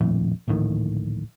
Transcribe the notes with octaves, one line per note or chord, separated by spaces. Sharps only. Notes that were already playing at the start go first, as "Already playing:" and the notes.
D#1 A#1 F2 A2
D1 A#1 A2 D#3